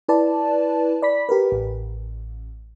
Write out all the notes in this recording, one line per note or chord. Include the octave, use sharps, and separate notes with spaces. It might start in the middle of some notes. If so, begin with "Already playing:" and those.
E4 B4 D5 A5
D5 B5 B6
G4 A#4 B4
A1